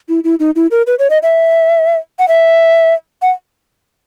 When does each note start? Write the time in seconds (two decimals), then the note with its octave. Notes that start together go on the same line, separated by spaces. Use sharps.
0.09 E4
0.24 E4
0.40 D#4
0.56 E4
0.71 A#4
0.87 B4
0.99 C#5
1.10 D#5
1.23 E5
2.19 F#5
2.28 E5
3.22 F#5